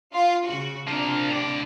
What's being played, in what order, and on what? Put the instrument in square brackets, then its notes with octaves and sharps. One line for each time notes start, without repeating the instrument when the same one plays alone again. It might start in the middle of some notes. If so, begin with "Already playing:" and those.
[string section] F4
C#3 F#4
[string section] C3 D4 [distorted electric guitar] F3 A#4
[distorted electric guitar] A2 D5